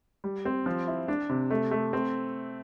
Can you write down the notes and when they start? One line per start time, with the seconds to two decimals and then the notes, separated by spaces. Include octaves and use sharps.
0.24 G3
0.45 C4
0.66 F3
0.87 E4
1.08 D4
1.30 C3
1.50 A3
1.71 A3
1.93 C4